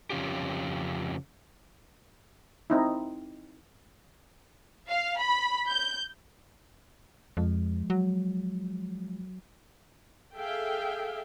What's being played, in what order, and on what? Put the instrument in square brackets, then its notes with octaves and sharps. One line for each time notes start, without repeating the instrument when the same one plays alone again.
[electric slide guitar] F2 A#2 C#3 C#4 F4 G4
[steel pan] C4 D#4 E4
[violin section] F5
B5
G6
[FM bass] F2 [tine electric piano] F3 G#3
[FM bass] F#3
[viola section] G#4 A4 E5 F5 G5